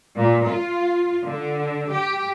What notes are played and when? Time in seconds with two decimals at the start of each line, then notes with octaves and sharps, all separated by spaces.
0.15 A#2
0.46 F4
1.23 D3
1.89 G4